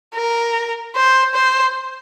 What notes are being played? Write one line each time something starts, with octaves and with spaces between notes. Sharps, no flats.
A#4
C5
C5